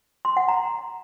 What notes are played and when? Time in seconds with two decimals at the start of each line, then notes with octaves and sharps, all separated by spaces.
0.25 C6
0.37 F#5
0.48 A#5